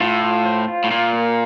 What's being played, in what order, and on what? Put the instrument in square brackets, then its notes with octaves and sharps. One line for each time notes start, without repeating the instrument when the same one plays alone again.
[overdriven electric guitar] A2 [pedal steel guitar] F4
[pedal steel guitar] F4
C5
F4
[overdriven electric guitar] A2
[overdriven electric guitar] A#2 [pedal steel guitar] F4
[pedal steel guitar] A#3